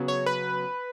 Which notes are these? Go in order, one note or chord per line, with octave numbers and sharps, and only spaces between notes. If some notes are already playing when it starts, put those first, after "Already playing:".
Already playing: C#3 F#3 B3
C#5
B4